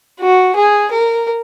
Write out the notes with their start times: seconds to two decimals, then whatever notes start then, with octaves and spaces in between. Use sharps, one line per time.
0.20 F#4
0.55 G#4
0.91 A#4